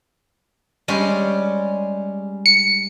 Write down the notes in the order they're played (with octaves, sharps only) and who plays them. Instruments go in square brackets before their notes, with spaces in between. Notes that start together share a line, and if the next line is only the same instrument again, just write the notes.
[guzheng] G3 G#3 C#4
[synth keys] C#7